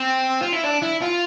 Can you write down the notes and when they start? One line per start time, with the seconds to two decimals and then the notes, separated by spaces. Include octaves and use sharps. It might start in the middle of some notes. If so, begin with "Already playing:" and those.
Already playing: C4
0.42 F4
0.53 E4
0.64 D4
0.82 E4
1.02 F4